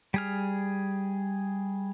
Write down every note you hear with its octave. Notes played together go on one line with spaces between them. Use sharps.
G3 G#4 F6